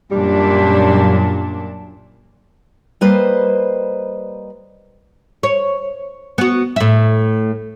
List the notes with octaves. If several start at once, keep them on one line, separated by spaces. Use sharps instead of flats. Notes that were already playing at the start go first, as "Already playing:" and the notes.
F#2 A#2 G3 D4
G3 A#3 B4 C5 D#5
C#5
B3 F#4
A2 E5